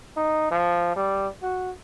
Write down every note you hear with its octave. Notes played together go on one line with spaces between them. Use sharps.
D#4
F3
G3
F#4